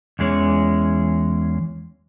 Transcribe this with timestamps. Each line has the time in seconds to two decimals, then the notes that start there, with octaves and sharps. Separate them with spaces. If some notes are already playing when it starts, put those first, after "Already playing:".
0.19 E2 E3 G#3 C#4 C#5